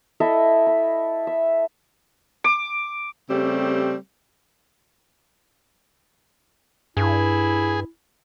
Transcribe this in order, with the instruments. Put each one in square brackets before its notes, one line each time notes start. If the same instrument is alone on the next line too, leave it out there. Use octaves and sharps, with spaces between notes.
[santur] E4 A4 D#5 E5
B5
E5
D6
[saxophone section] C#3 G3 A3 C4 G4
[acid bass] G2 [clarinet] E4 [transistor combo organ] G#4